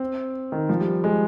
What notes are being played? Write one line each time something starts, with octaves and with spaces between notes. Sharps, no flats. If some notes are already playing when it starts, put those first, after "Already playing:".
Already playing: C4
D#3
F3
G3
G#3